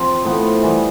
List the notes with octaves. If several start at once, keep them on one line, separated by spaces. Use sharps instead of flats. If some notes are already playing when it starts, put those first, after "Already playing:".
Already playing: F3 C4
A2 F3 B3
E3 G3 B3